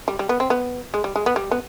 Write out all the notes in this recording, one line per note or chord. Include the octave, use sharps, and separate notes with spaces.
G3
G3
B3
C4
B3
G#3
G3
G#3
B3
G3
B3